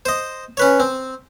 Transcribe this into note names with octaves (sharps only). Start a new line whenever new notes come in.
C5 D#5
C#4 B4 C#5
C4